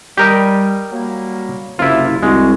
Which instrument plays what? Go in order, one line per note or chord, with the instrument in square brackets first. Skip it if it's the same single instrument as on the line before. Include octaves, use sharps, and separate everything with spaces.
[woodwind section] G3 [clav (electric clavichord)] G4 A#4 D#5
[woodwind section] F#3 G3 A#3
[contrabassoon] F#1 [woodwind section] C3 [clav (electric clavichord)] E4 F4
[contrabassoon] C2 [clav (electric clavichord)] G#3 [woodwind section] F#4